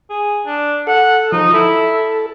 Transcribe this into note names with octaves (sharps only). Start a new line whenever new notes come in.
G#4
D4
A4 F#5
F3 D#4
E4 A4